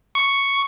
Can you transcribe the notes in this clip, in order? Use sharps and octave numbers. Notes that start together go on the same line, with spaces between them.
C#6